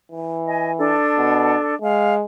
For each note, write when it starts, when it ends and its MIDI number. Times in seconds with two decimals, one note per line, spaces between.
0.12 0.97 52
0.47 0.72 75
0.47 0.72 80
0.77 1.74 62
0.77 1.74 69
1.18 1.56 47
1.82 2.25 56
1.82 2.15 77